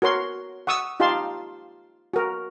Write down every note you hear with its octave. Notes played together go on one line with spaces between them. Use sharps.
F#4 A#4 C#5 C6
F#5 C#6 D#6 E6
D#4 F4 G4 F5 A5 C6
F#4 A#4